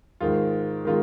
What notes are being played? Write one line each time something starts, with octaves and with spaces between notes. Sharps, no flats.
G#2 D#3 G#3 F4
D#3 G#3 F4